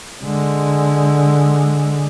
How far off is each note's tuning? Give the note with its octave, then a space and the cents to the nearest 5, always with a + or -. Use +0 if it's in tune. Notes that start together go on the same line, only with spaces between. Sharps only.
D3 +0 G#3 +0